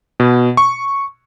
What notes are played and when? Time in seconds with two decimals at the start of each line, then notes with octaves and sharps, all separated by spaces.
0.20 B2
0.57 C#6